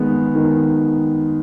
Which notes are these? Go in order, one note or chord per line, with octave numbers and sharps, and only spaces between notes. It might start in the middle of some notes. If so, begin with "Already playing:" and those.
Already playing: D#3 G#3 B3
D#3